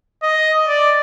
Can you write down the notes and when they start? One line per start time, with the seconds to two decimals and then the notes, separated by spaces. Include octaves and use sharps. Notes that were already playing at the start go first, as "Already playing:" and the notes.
0.23 D#5
0.68 D5